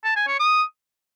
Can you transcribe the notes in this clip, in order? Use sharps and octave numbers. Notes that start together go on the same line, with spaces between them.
A5
G#5
C#5
D#6